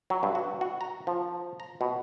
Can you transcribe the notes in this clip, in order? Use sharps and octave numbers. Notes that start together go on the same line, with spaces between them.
F#3
G2
F#4
F#4
A#5
F3
A#5
B2